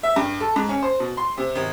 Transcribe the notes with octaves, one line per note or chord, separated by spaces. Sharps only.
E5
G2
A4
G#2
C#4
C5
B2
C6
C3
G#1